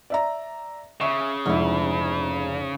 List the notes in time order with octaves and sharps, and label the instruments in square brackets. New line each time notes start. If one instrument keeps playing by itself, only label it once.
[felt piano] D5 E5 A#5
[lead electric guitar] C#3 [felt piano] E5 C#6
[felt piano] F1 [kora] G#2 E4